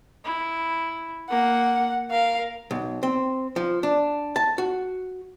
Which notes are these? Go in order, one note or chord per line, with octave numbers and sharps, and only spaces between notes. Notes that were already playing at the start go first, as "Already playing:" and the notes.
E4
A#3 F#5
A#4 F5
B1
C4
F3
D4
A5
F#4